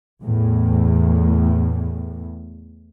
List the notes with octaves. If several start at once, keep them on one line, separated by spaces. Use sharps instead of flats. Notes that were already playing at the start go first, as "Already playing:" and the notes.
E2 A2